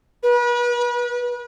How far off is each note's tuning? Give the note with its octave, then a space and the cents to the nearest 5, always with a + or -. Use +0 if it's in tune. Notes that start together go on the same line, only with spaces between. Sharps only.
B4 -35